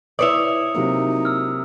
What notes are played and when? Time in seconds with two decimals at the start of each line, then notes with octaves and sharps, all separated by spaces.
0.19 E4 B4 C#5 D5 D#6 C#7 F7
0.75 C3 F#3 A#3 D#4
1.25 E6 F6